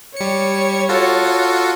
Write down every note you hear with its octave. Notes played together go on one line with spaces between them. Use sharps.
G3 C#5 C#7
F4 F#4 A4